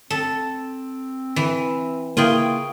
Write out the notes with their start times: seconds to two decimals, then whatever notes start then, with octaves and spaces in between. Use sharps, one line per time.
0.10 C4 A4
1.36 E3
2.17 C#3 A#3 E4 F4 G#4 G5